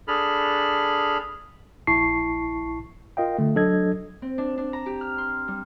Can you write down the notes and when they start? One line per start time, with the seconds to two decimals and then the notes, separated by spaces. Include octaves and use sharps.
0.08 D4 G#4 A4 B5 F6
1.87 A#1 E4 A5 C#6 C7
3.17 F4 A#4 D#5 F5 G5
3.38 D3 A3
3.55 F#3 D4 A4 D#5 G#6
4.22 C4
4.38 D4
4.58 D4
4.73 A#5
4.86 G4
5.01 F6
5.18 C6
5.48 G3